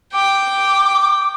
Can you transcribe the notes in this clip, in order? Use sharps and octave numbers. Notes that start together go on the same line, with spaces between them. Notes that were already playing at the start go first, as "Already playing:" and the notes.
G5 D6